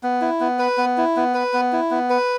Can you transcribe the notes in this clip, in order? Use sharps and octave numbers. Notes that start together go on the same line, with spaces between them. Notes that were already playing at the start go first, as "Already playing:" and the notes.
B3
E4
B3
B4
B3
E4
B3
B4
B3
E4
B3
B4